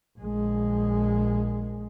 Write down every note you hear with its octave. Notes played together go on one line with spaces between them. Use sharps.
A#1 G#3